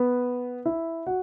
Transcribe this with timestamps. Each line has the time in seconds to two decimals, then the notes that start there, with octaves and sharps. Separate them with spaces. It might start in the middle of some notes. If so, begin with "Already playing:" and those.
Already playing: B3 B4
0.65 E4 E5
1.07 F#4 F#5